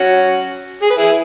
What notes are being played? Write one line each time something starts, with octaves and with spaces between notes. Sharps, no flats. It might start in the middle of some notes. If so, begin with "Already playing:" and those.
Already playing: C#4 F#4
G#4
B4
E4 G#4